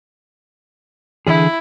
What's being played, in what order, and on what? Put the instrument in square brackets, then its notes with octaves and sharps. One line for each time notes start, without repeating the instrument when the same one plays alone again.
[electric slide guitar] D3 E3 G#4 [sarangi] E4